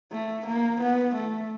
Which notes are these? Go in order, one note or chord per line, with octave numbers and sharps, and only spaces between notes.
A3
A#3
B3
A3